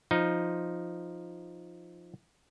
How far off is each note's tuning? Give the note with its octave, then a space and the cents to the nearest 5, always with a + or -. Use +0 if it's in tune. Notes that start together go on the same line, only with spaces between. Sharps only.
F3 +0 D#4 +0